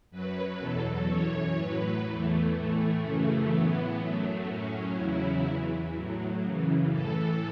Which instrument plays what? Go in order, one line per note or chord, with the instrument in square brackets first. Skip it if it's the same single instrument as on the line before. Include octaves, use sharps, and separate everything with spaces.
[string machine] F#2 F#3 B4
E2 B2 F#3 A4
F#2 E3 C#5
A2 F#3 B4
E2 E3 A3
A2 E3 A3
F#2 C#3 E3
A2 E3 B3
F#2 F#3 A3
A2 F#3 C#4
E2 C#3 F#3 E4
E2 E3
A2 F#3
F#2 C#3 E3
A2 E3 A4